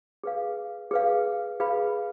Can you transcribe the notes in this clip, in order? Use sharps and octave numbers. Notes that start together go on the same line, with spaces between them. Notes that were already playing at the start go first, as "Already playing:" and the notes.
G#4 B4 F5
G#4 B4 F5
G#4 B4 F5 B5